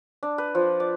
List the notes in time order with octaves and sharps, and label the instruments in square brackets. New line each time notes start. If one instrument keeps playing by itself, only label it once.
[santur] D4
B4
F3
D5